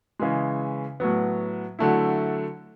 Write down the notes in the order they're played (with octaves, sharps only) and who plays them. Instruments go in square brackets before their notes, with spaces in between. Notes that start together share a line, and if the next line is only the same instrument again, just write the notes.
[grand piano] C#3 E3 G#3
A2 F#3 B3
D3 F#3 A3 E4